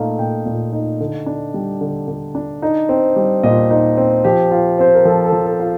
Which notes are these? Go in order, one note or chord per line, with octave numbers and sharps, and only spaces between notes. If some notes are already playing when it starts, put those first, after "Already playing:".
Already playing: A#2 A3 D#4 F5
A#2 G5
A#2
D#4
D3
D4
G3
D3
D3
D4
D#4
C4
G3
A#2 D#5
D#4
C4
F3 G4
F4
C4 C5
A#4
F3 A4
A4
F3
A4
F4